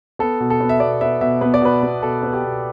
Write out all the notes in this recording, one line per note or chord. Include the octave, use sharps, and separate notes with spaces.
B3 A4
B2
A4
B3
E5
B2 D5
B3 E5
B2 E5
B3 B4
D5
B2 B4
B3
B2 A4
B3
G4
B2